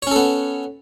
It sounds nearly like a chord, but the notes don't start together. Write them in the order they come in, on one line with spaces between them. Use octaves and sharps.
C#5 C#4 A4 B3